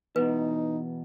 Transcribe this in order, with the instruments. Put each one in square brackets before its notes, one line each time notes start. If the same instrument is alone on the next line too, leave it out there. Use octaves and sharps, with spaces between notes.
[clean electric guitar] E2 B2 [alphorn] D#4 [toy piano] B4